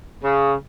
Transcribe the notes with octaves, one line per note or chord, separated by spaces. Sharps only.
C#3